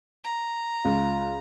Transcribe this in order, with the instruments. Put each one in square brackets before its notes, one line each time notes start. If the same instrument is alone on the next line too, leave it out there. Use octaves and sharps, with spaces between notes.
[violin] A#5
[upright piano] C#2 [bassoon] F4